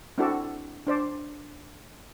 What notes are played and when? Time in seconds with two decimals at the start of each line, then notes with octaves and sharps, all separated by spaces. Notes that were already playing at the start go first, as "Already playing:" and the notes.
0.18 C4 D4 E4 F#4 A4 D5
0.87 D4 C5 D5